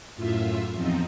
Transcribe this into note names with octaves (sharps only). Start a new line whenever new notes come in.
F#2 A2 F4 E5
E2 F3 C4 D#4